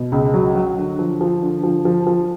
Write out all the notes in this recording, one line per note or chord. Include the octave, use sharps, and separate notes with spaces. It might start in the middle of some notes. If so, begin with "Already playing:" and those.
Already playing: B2
C#2
F#3
F#3
D3
F3
F3
D3
F3
F3
F3